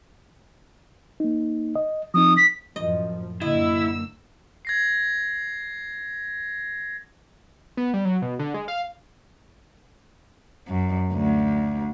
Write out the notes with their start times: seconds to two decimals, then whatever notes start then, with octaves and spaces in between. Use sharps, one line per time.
1.20 A#3 D#4
1.76 D#5
2.14 F3 C4 D#4 D#6
2.37 B6
2.76 F#2 A2 F3 D#5
3.41 F#2 D3 A#3 E4 D#5 E6
4.65 G#6 A#6 C7
7.77 B3
7.94 G3
8.05 F#3
8.22 B2
8.39 D3
8.54 G#3
8.68 F5
10.68 F#2
11.14 D2